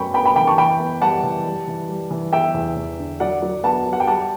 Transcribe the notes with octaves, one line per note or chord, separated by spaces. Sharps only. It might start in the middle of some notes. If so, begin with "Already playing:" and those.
Already playing: F#2 A3 B3 G5 B5 C#6
B3 G5 B5
G5 B5
E3 G5 B5
A5 C#6
E3 G5 B5
B3
G3 F#5 A5
E3
G3
E3
G3
E3
B3 E5 G5
E2
E2
D3
F#3 D5 F#5
F#3
B3 F#5 A5
F#3
F#5
G5
G3 F#5 A5